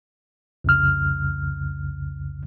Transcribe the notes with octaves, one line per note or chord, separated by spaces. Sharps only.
C2 F2 C#3 F6